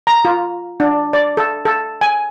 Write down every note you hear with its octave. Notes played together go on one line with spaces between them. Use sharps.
A#5
F4
D4
D5
A4
A4
G#5